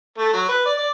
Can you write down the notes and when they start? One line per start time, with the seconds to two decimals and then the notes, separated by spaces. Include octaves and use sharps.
0.18 A3
0.33 F#3
0.49 B4
0.66 D5
0.79 D5